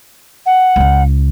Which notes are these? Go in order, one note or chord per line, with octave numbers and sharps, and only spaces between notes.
F#5
C#2 C#3